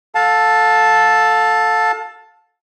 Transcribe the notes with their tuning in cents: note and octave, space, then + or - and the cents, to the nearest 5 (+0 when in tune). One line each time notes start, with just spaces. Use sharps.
A4 +0 F5 +30 A5 +0